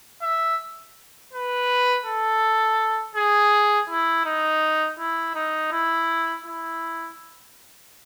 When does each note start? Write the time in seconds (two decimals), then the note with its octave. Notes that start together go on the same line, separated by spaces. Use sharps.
0.22 E5
1.33 B4
2.05 A4
3.15 G#4
3.89 E4
4.25 D#4
4.99 E4
5.35 D#4
5.72 E4
6.46 E4